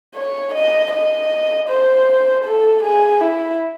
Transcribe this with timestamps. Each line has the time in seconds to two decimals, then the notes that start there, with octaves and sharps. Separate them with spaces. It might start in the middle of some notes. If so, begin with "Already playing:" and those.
0.15 C#5
0.54 D#5
0.92 D#5
1.69 C5
2.44 A4
2.83 G#4
3.21 E4